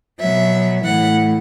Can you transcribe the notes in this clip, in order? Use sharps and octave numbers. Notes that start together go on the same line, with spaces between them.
B2 F#3 E5
A2 E3 F#5